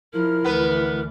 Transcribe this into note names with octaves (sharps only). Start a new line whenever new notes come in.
F3 E4 A#4 F6
D2 E3 B3 B4